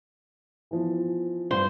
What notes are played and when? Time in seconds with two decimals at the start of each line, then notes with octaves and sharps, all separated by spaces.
0.71 E3 F3 B3
1.51 G2 C5